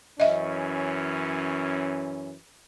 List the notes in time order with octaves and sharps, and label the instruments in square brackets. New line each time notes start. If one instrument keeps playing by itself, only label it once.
[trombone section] F#2 E3 C#4 [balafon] D#5 E5